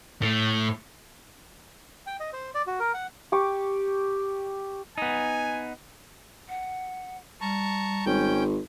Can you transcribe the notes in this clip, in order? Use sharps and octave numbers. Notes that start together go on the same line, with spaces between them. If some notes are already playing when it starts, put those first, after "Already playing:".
A2
G5
D#5
C5
D5
F#4
A#4
F#5
G4 C#6 D6
B3 D#4 G#5
F#5
G3 A5 A#5 C#6
G#1 C#4 G5 G6